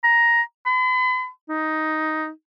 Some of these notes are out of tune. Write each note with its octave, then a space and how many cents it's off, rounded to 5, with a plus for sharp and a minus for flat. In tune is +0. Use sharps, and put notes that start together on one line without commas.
A#5 +10
B5 +40
D#4 +5